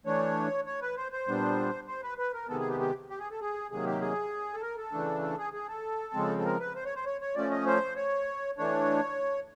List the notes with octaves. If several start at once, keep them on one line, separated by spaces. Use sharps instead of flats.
E3 A3 D4 C#5
C#5
B4
C5
C5
A#2 G3 B3 D4
C5
B4
B4
A#4
C3 D#3 G#3 B3 A4
G#4
G4
G4
G4
G#4
A4
G#4
C3 D#3 F#3 A#3 G#4
G4
G#4
A4
A#4
A4
C#3 E3 A3 D4
A4
G#4
G#4
A4
C#3 F3 G#3 C4
A4
A#4
B4
C5
C#5
C5
C#5
C#5
F3 A3 C#4 D5
D#5
C5
C#5
E3 A3 D4 C#5